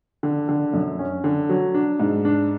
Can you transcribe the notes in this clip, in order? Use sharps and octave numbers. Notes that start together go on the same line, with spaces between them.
D3
D3
F#2
C#4
D3
F#3
D4
G#2
D4